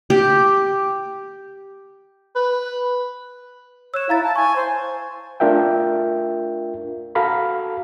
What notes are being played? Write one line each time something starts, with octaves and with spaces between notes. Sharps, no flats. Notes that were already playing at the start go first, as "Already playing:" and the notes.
G4
B4
C#5 E6 F#6 E7
E4 F5 A#5 A6
A5
G#5 C#6
C5
A3 D4 F4 A#4 E5 G5
F#4 A4 F5 A#5 B5